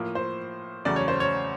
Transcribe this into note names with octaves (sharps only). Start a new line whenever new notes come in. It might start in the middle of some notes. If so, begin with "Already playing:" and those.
Already playing: A2 F3 A#3
C5
E2 C#3 F#3 A3 D5
C#5
C5
C#5